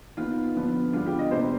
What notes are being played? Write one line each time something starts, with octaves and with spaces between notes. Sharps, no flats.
D#3 B3 F4
D3 F3 B3
D3 G3 B3 F4
G4
D#5
C3 G3 B3 C5